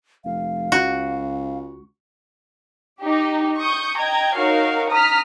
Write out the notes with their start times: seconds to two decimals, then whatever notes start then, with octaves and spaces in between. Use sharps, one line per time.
0.25 F1 F5
0.72 C#2 F#4
3.01 D#4 G4
3.57 C#6 D#6 G6
3.97 D#5 G5 A#5 G#6
4.36 D#4 F#4 A#4 C#5 F5
4.91 A#5 D#6 F6 B6